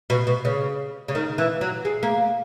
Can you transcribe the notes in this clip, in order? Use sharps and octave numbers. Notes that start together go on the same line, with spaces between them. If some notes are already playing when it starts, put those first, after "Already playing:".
B2
B2
C#3
C#3
D#3
E3
F#3
G#3
A#3